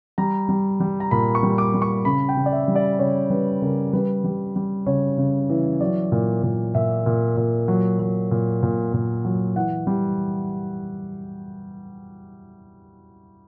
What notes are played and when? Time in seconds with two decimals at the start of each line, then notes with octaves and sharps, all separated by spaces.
0.18 G3 A#5
0.49 G3
0.80 G3
1.00 A#5
1.11 A#2 B5
1.35 C#6
1.43 G3
1.58 D6
1.74 G3
1.82 C#6
2.05 C#3 B5
2.29 G5
2.37 C#3
2.46 D5
2.52 E5
2.68 G3
2.75 D5
2.99 C#3 C#5
3.30 G3 B4
3.62 C#3 A#4
3.93 G3 B4
4.24 G3
4.56 G3
4.86 C#3 C#5
5.18 C#3
5.50 E3
5.80 F#3 D5
6.12 A#2
6.43 A#2
6.75 A#2 E5
7.06 A#2
7.37 A#2
7.68 F#3
7.99 F#3
8.31 A#2
8.63 A#2
8.93 A#2
9.25 F#3
9.56 E3 F#5
9.87 G3